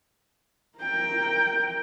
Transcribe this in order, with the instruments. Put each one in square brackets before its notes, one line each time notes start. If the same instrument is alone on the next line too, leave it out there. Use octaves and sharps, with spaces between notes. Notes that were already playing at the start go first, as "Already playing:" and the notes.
[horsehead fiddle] A#4 G5